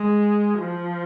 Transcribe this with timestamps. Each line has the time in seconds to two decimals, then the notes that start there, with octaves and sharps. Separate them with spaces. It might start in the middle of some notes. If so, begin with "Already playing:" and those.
Already playing: G#3
0.59 F3